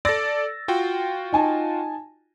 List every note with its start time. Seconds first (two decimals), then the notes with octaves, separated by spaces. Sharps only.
0.05 A4 D5 E6 A6 A#6
0.68 F4 F#4 G5
1.33 D#4 G#5 A5